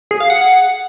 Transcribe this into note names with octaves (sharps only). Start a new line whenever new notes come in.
G#4
F5
F#5